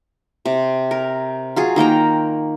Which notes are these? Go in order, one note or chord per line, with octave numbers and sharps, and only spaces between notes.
C3
A#4
F#3 F4 G#4
D#3 A#3 G5 A#5